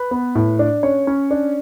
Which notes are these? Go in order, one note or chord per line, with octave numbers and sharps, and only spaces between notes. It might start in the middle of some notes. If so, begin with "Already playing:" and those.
Already playing: B4
B3
A2
D4
C#4 C#5
C#4
D4